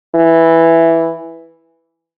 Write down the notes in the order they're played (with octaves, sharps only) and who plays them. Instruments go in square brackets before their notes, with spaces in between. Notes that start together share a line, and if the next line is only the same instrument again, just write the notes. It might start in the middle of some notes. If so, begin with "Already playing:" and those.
[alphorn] E3